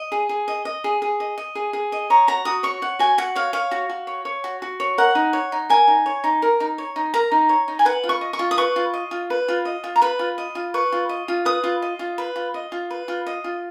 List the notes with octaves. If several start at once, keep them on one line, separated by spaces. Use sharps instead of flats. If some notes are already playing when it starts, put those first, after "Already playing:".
Already playing: D#5
G#4
G#4
D#5
D#5
G#4
G#4
D#5
D#5
G#4
G#4
D#5
C#5 A#5
F#4 A#5
F#4 D#6
C#5 C#6
C#5 F#5
F#4 G#5
F#4 F#5
C#5 F5
C#5 F5
F#4
F#4
C#5
C#5
F#4
F#4
C#5
A#4 F#5
D#4
C#5
D#4
A#4 G#5
D#4
C#5
D#4
A#4
D#4
C#5
D#4
A#4 A#5
D#4
C#5
D#4
G#5
B4 F#5
F4
C#6
D#5
C#6
F4
D#6
B4 C#6
F4
D#5
F4
B4
F4
D#5
F4
A#5
B4 B5
F4
D#5
F4
B4 C#6
F4
D#5
F4
B4 D#6
F4
D#5
F4
B4
F4
D#5
F4
B4
F4
D#5
F4